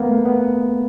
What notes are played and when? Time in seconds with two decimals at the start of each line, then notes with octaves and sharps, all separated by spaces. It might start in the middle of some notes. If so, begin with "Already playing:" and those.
Already playing: A#3 B3
0.09 A3
0.25 B3